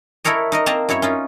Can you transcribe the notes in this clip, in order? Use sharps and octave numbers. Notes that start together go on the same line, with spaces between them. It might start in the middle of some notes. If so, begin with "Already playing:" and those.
E4 A4 A#4 C#5 D#5
D#4 A#4 D#5
A#3 C4 D#5 A5 A#5
F#2 E4 C#5 E5
C#4 D#4 F4